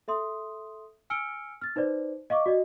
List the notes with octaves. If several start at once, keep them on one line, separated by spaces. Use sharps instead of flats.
A4 E5 C6 D#6
G#5 E6 F6 C#7 D7 G7
F6 A6
D#4 B4 C5 D5
D#5 F5 C#6 D6
F#4 D5 D#5